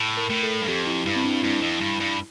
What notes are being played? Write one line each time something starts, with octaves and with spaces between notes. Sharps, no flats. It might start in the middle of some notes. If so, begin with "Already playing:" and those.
Already playing: A2
A#4
A2
A4
G2
F2 G4
E4
G2 E4
C4
D4
G2 E4
F2
G2
G2